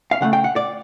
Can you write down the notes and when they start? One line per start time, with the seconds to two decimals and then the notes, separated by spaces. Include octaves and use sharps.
0.11 F5
0.21 C#3 F#3 A3 F#5
0.33 G5
0.44 F#5
0.56 D5